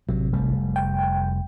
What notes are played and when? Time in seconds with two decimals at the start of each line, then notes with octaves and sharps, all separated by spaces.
0.09 A1 C3 F#3
0.32 F1 G3 A3
0.76 G5